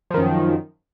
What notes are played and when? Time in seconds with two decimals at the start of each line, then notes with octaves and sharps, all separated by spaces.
0.11 F3
0.14 D#3
0.17 F#2